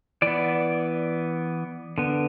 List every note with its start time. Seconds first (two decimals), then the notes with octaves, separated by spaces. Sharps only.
0.22 E3 B3 D5
1.98 D3 B3